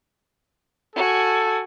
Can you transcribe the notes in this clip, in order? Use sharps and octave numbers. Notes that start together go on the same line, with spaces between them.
F#4 A4 G#5